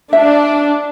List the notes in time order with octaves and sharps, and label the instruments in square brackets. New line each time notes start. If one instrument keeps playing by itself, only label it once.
[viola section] D4 [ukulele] E5